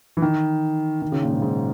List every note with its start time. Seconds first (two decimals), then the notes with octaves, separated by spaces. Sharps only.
0.17 E3
0.22 D#3
1.02 D#3
1.12 C#3
1.22 A#2
1.32 G#2
1.42 G#2